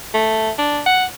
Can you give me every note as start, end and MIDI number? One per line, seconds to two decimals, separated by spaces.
0.14 0.50 57
0.58 0.80 62
0.86 1.05 78